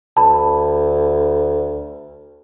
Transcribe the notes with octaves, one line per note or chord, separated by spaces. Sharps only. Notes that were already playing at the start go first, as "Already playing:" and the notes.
D2 A5 B5